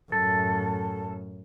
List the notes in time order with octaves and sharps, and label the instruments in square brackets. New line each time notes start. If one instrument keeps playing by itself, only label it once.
[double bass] F#2 A2 [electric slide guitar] A4